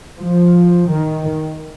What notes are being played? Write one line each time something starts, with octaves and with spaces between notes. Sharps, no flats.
F3
D#3